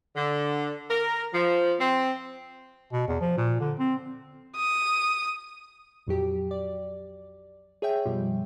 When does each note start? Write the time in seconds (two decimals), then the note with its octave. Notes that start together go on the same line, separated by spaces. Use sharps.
0.15 D3
0.89 A#4
1.33 F3
1.78 C4
2.93 B2
3.08 E2
3.21 F3
3.37 A#2
3.60 D3
3.79 C4
4.57 D#6
6.07 A#1 F2 F#3 G4
6.51 D5
7.82 G#4 C#5 E5 G5
8.05 F#2 B2 F3 G3